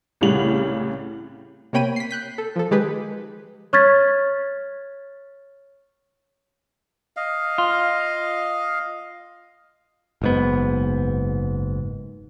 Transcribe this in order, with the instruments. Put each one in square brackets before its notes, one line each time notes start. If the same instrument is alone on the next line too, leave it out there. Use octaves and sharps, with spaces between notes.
[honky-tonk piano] C2 A2 C#3 G3 F#7
[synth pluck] C3 A#3 C#5 G5 B5 D#7
B6 C7
F#6 G6 B6
A4
F3 A4
D#3 G#3 G4 G#4 B4
[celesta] C#5 C#6 F6 G#6 A6 B6
[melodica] D#5 F5
[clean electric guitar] F4
[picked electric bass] F#1 G#2 B3